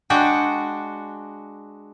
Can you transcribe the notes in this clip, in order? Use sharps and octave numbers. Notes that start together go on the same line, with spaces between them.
G#3 D4 F#4 G5